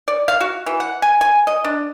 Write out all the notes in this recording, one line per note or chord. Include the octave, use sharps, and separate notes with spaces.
D5
F5
F#4
E3
F#5
G#5
G#5
D#5
D4